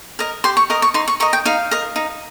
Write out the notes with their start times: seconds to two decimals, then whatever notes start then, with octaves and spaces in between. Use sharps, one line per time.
0.19 A#4 D#5
0.44 G4 C6
0.57 C#6
0.70 A#4 D#5 D#6
0.82 C#6
0.94 D#4 C6
1.08 C#6
1.20 A#4 D#5 C#6
1.33 G5
1.45 D#4 F5
1.71 A#4 D#5
1.96 D#4